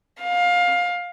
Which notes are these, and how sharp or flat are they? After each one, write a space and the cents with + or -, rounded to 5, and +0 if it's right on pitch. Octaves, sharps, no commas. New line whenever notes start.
F5 +20